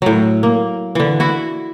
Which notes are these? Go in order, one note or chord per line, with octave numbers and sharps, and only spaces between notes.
A2 F#3
A#3
D3 E3
E4 F#4